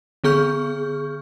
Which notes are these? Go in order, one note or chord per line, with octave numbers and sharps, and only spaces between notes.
D3 B3 G#4 C#6 F6 G6